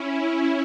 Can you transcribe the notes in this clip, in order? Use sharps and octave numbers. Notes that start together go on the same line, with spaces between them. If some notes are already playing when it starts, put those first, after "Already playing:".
Already playing: C#4 E4